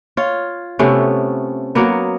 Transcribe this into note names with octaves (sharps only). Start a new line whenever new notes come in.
F4 C#5
C3 A3 B3 C#4
F#3 A#3 B3